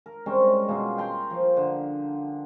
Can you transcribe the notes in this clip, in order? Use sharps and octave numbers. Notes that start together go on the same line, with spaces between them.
A#4
G3 G#3 C4 C#4
B2 A#3 F4 G#4
G5 A#5 C6
F3
D3